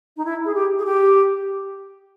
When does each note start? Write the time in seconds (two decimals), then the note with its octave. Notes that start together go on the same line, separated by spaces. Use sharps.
0.17 D#4
0.25 E4
0.45 G#4
0.55 G4
0.79 G#4
0.85 G4